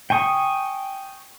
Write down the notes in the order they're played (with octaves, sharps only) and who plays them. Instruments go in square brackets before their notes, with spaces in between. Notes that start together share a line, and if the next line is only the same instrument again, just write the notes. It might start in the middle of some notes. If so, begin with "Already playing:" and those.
[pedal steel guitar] G5 G#5 C#6 D#6